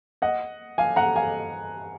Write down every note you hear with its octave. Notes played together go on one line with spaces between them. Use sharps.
D#5 F#5
F5 G#5
F#5 A#5
F5 G#5